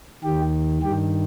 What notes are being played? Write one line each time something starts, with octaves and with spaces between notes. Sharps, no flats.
D#2 D#3 G4
G2 D#3 G4